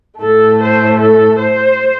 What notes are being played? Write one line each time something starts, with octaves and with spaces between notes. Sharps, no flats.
A2 A3 A4
C5
A4
C5